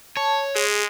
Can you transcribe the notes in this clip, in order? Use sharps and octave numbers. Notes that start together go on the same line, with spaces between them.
C#5 A5
G#3 G#4